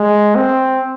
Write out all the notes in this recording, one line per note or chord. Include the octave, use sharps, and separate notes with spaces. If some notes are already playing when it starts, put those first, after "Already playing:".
Already playing: G#3
C4